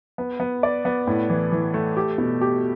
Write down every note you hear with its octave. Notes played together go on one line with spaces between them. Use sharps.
B3
B3
D5
B3
A2
E3
E3
A3
G4
B2
G4